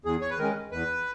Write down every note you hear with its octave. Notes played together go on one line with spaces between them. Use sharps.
E2 G#4
C#5
B4
D#3 G#3 C#4 A#4
E2 B4